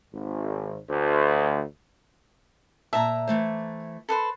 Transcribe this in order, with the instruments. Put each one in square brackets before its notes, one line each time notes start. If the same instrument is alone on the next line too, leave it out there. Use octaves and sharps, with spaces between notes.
[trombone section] G#1
D2
[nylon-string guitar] A#2 A5 [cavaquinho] E5 A#5
[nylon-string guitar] E3 A3 C5
[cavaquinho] A4 B4 C5